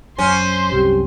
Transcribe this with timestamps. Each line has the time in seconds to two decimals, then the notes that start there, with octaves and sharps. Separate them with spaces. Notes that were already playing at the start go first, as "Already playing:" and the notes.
0.18 F#2 C#4 C5 C6
0.72 C2 F#2 G4